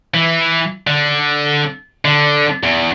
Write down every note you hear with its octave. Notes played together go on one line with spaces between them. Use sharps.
E3
D3
D3
E2